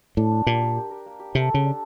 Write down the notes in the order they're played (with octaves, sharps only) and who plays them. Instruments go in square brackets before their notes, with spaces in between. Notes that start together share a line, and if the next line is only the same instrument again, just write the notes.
[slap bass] A2 [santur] D4
[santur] D4
[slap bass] A#2 [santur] G4
[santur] A#4
G4
A#4
A#3
G4
[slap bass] C3 [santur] A4
[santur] A4
[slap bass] C#3
[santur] D4